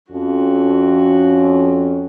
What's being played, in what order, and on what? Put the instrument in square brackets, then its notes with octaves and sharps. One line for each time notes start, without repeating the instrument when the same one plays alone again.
[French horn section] F2 C#4 [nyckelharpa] F#4